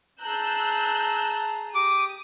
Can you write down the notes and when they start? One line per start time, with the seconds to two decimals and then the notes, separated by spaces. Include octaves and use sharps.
0.22 G#4 A5 A#5 E6 F#6 G6
1.75 G4 D6 D#6